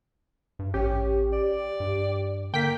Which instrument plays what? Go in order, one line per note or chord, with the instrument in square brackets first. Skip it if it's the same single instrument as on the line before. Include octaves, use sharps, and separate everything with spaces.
[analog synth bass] G2
[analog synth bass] A1 [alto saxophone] C#4 [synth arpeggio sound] G4
[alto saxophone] D5
[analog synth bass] G2
[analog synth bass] D3 [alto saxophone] A#3 [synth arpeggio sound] G5 B6